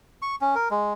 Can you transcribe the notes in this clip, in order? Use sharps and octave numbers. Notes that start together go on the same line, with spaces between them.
C#6
C#4
A#4
G#3